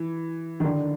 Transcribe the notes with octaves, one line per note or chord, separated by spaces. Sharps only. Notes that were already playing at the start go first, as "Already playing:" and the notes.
Already playing: E3
D#3
D3